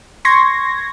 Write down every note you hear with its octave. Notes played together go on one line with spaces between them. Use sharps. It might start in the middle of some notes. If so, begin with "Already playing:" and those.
C6 C#6 G#6 A#6